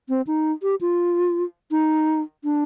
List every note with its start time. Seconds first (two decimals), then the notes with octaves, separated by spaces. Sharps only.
0.09 C4
0.27 D#4
0.63 G4
0.81 F4
1.71 D#4
2.44 D4